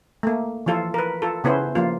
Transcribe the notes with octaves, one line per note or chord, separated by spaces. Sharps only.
A3 A#3
E3 F3 F4 A4
A#4 B4
F4 A4
C#3 B3 C#4 E4 C5
F3 A#3 F4